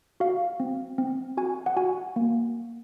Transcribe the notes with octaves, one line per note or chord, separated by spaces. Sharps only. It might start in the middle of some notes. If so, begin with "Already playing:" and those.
F#4 F5
C4
C4
F#4 G#5
F#5
F#4 G#5
A#3